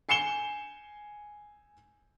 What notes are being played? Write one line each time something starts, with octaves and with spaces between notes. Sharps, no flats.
G#5 C7 C#7 E7 G7